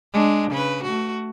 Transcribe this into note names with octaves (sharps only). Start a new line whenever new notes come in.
G#3 D4
C#3 B4
A3 F#4